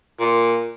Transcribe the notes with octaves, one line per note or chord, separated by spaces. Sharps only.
A#2